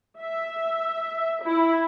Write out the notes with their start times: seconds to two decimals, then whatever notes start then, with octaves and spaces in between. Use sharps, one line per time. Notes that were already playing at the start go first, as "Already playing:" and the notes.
0.19 E5
1.43 E4